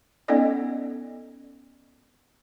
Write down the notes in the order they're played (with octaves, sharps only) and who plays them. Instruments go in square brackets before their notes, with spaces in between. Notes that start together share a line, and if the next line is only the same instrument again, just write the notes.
[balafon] B3 C#4 D#4 A4 D5 D#5